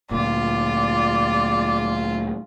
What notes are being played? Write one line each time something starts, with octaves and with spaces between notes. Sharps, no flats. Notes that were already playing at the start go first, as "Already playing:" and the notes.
D2 A#2 F4 D5